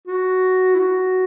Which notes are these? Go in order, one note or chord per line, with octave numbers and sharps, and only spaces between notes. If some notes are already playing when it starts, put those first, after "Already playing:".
F#4
E4
F#4